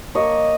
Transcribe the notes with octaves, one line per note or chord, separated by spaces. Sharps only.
A#3 C#5 D#5